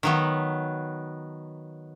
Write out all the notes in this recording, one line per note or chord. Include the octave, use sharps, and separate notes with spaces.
D#3 F#3 B3